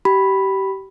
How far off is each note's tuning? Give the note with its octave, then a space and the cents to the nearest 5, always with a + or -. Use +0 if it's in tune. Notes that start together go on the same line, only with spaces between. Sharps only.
G4 -30 B5 +0